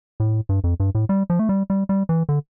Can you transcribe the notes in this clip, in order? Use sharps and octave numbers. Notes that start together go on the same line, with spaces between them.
A2
G2
F2
G2
A2
G3
F3
A3
G3
G3
G3
E3
D3